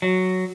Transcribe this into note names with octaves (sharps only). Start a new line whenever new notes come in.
F#3